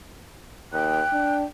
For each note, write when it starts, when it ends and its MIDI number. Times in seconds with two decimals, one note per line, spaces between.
0.73 1.02 39
0.73 1.41 79
0.73 1.36 90
1.12 1.44 62